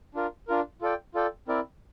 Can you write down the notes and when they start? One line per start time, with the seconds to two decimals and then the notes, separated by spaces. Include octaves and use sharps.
0.15 D4 F4 A#4
0.48 D4 F4 A#4
0.82 F4 A4 D5 G5
1.14 F4 A4 D5 G5
1.48 C4 E4 A#4 D5